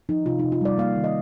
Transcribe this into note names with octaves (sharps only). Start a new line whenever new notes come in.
F3 D#4
C3 F4
D#4
C3
F4
G3 D5
A#3 F5
D#3
D#5